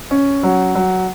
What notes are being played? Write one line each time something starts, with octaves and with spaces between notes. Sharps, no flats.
C#4
F#3
F#3